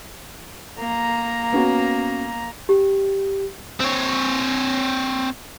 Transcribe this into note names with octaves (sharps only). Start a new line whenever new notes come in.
A#3 A#5
B3 C#4 F#4
G4
C4 C#5